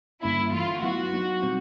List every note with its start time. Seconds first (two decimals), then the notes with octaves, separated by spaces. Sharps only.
0.22 G2 D3 G3 A#3 C#4 E4
0.52 G2 E3 A3 F4
0.83 F#3 B3 E4 F#4
1.13 F#3 B3 D#4
1.42 B2 G3 C4